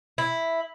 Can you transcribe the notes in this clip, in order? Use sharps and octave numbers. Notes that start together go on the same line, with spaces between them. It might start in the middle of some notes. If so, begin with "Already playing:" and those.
E4